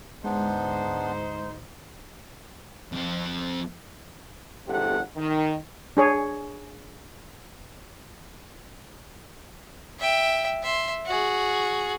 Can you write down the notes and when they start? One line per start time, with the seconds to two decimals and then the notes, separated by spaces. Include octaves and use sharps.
0.24 D2 G#2 G#3 B3 D4 D#4 C5
2.92 F2 C4
4.68 G1 E2 C3 G4 A4 F#5
5.17 D#3
5.97 D4 G#4 C#5
9.99 E5 G5
10.63 E5 C6
11.06 F#4 G#4